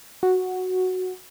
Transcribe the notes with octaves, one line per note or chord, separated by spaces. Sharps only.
F#4